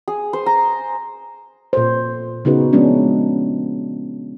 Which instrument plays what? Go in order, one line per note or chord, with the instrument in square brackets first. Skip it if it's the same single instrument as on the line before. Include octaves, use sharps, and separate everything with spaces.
[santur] G#4
C5
A#5
[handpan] A#2 A4 C5
C#3 B3 D#4 F#4 G#4 B4
F3 G#3 A#3 B3 C#4 D4